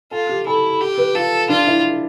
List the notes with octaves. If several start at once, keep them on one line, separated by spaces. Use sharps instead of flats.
F4 A4
G4
E4 A4
G4
B4
F4 A4
D4 F4
E4